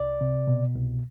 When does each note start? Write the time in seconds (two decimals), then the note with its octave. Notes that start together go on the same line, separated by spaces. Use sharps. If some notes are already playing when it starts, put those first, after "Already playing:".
Already playing: C2 D5
0.21 C3
0.47 B2
0.75 C2